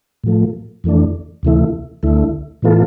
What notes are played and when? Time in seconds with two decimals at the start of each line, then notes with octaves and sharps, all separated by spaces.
0.24 A2 F3 A3
0.84 F2 E3 A3 D4
1.43 D2 C3 E3 A3 E4
2.03 D2 D3 A3 E4
2.62 A2 E3 B3 F4 A4